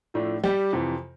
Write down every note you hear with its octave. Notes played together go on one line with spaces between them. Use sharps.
A2 F3 A3 D4
G3 G4
F2 C3 E3